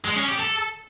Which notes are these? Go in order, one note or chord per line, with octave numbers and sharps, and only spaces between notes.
G#3
C#4
G4
A4